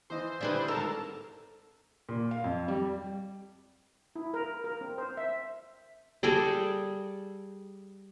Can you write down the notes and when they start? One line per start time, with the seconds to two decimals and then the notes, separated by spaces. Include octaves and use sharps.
0.10 E3 C5 D#5
0.41 D3 G3 E4 G#4 B4 D5
0.68 G#1 A4 A#4 A5 A#5 E6
2.09 A#2
2.31 F5
2.44 F2
2.68 G3
4.16 E4
4.34 A#4
4.64 A#4
4.81 C4
4.98 C5
5.17 E5
6.23 G3 G#4 A4 D5